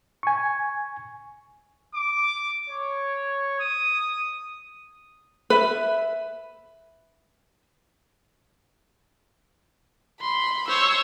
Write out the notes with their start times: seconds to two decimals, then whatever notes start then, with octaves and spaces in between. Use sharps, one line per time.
0.23 G#5 C#6
1.95 D6
2.70 C#5
3.60 D#6
5.50 B4 E5
10.21 B5 C6
10.68 C5 C#5 E6